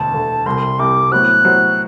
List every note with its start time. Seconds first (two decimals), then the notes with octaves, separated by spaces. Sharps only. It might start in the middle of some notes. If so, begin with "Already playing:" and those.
Already playing: E1 D2 D3 A5
0.13 E1 D2 D3
0.46 C2 C3 G3 C6
0.79 C2 C3 G3 D6
1.12 A2 F#3 B3 F#4 C5 F#6
1.44 A2 F#3 B3 F#4 C5